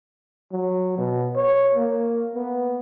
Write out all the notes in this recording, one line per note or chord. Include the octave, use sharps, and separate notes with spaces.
F#3
B2
C#5
A#3
B3